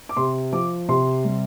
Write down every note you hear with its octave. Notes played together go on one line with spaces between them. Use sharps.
D6
C3 C6
F3 D6
C3 C6
G3